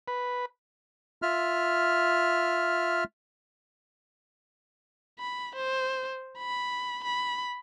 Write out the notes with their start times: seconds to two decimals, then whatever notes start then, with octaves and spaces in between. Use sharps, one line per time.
0.08 B4
1.22 F4 E5 F6
5.19 B5
5.56 C5
6.38 B5
7.04 B5